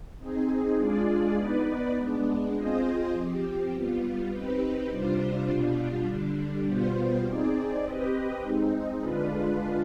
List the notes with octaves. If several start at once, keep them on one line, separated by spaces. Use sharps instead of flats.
C4 D#4 G#4
G#3 D4 F4 G#4 D5
B3 D#4 B4 D5
G#3 B3 D4
C4 F4 G#4 C5 D#5
F3 C4 G4
G3 B3 F4
C4 D#4 G4 B4
C3 G3 D4 F4 C5
B2 G3 D4 F4
D3 G3 D4
B2 G3 B3 F4 C5
C4 D#4 G#4 D5
C4 G4 B4 D#5
G#3 C4 D#4
D3 G#3 D4 F4 B4